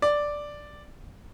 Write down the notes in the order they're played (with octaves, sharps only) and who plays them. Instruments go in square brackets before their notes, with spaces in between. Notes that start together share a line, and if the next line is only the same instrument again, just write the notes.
[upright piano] D5